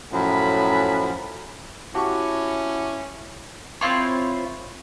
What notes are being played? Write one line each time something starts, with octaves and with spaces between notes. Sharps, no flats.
F#2 A2 F3 B5
C#4 E4 F#4 G4 A5 C#6 D6
C4 E4 F4 C#5